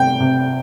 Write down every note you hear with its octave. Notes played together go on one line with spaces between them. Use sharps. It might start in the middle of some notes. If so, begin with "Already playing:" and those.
Already playing: C3 G5
C3